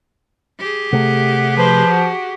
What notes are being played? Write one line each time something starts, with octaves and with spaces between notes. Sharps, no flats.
G4 G#4
C3 A3 F#5
F3 B4 C5
F#4